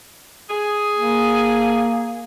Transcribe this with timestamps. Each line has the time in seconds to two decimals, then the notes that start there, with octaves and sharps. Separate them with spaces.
0.50 G#4
0.95 A#3